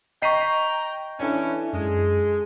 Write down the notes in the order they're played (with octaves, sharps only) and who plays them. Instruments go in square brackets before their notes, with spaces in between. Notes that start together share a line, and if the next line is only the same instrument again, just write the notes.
[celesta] D#5 C#6 [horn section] G5 A#5 [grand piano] B6 C7 D#7
[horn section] E3 C#4 [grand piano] D4 A4 G#5 [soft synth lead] E4
[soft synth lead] F#2 [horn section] G#3